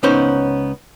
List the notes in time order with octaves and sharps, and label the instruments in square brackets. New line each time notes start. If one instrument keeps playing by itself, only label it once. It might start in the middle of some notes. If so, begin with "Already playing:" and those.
[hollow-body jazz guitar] C#2 B3 C#4 D#4 C5